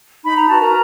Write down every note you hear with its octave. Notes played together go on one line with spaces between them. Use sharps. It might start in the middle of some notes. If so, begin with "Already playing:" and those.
D#4 B5
A#5
F#4 B4 A5
A#4 A#5